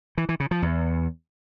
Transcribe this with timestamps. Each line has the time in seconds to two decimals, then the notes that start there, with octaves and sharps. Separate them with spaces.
0.18 E3
0.29 E3
0.40 C#3
0.51 F3
0.62 E2